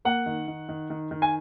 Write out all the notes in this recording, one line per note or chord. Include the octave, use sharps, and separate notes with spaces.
A#3 F#5
D#3
D#3
D#3
D#3
D#3
G#5